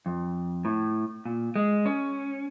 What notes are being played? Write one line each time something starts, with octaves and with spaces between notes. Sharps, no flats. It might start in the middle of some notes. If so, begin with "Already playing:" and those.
F2
A2
A#2
G#3
C#4